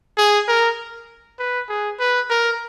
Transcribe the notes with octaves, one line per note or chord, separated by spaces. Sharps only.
G#4
A#4
B4
G#4
B4
A#4